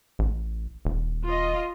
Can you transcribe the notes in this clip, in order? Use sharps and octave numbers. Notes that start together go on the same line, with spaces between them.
A1
D#1
F4 D#5